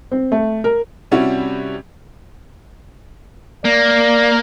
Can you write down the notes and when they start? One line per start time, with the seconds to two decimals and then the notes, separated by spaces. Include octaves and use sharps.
0.12 C4
0.32 A3
0.64 A#4
1.11 C3 G3 C#4 E4 F#4
3.65 A#3 D5